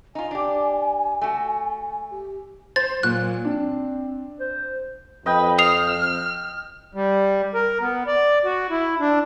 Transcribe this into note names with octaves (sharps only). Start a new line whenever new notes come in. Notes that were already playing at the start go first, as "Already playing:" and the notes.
D#4 F4 G#5
D4 G4
A3 F#4
G4
C5 A6
A#2 F#3 F#6
C4 D4
C5
F2 B4 D#5 G5
D#6 F6 C7 F7
G3
A#4
B3
D5
F#4
E4
D4